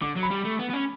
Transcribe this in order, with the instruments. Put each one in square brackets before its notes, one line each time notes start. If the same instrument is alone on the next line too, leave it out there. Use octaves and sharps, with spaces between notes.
[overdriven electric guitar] D3 [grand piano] D6
[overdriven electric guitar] F#3
[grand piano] B5
[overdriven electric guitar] G3
A3
B3
B3
C#4